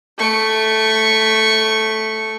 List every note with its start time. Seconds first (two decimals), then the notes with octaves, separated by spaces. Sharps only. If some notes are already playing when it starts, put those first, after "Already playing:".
0.18 A3 C#6